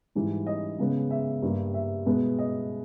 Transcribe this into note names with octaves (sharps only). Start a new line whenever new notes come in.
G#2 E3 G3
D#5
C#3 G#3 B3
E5
G2 G3 A#3
E5
B2 G#3 B3
D#5